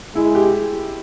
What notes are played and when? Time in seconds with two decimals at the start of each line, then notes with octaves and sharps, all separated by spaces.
0.15 G#3 E4
0.35 G4